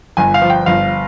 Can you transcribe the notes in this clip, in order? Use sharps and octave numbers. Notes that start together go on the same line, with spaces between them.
G1 G#5
F5
F3
G5
G1 F5